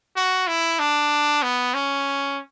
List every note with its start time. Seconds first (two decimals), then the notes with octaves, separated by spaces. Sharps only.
0.16 F#4
0.47 E4
0.79 D4
1.43 B3
1.74 C#4